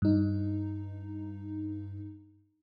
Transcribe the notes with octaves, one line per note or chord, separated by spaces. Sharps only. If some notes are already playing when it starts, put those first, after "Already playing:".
G2 D#4